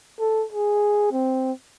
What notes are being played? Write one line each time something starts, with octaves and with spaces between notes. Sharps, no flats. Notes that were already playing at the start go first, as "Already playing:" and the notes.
A4
G#4
C4